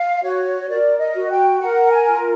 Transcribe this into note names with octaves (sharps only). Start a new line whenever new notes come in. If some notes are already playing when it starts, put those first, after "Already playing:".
Already playing: F5
F#4 C#5
A#4 D5
D#5
F#4
G5
A#4 F#5
G#5
F4